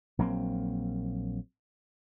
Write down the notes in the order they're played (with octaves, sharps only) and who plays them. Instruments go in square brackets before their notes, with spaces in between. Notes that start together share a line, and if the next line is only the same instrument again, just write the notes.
[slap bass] A#1 F#3 A#3 C4